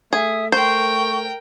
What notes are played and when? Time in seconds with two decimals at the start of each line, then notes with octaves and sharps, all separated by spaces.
0.13 A3 G#4 E5
0.52 A#4 C5 G5 C#6